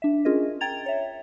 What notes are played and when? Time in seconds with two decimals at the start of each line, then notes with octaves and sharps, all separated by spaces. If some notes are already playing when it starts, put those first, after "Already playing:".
0.02 D4 E5
0.25 C#4 F4 G#4 A#4 D#5
0.61 G5 A#5 G#6 A6 F7
0.86 C#5 E5